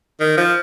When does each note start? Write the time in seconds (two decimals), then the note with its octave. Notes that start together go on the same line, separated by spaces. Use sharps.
0.20 D#3
0.37 F3